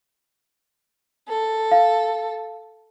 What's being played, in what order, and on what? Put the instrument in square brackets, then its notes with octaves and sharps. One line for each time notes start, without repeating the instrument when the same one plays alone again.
[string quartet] A4
[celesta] F5